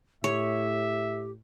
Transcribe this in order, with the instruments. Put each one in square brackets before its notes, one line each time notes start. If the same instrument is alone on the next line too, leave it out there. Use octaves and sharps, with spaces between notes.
[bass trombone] A2 [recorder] G4 [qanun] C#5 [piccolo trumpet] E5